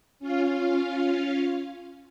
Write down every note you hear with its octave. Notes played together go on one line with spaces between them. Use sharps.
C#4 F4 F5